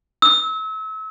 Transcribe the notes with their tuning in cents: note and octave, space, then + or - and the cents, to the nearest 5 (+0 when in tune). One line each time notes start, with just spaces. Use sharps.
E6 -35